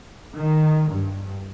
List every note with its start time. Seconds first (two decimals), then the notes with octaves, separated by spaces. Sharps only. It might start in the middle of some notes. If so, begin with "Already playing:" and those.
0.36 D#3
0.91 G2